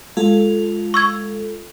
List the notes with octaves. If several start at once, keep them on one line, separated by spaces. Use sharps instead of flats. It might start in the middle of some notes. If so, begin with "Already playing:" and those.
G#3 F4 A4
C#6 E6 G#6